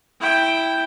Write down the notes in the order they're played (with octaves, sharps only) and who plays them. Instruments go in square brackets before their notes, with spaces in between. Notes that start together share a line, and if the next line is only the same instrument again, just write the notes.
[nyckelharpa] E4 G5